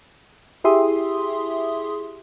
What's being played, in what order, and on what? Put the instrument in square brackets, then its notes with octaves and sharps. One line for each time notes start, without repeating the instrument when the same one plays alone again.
[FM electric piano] E4 G4 G#4 E5 C6 D#6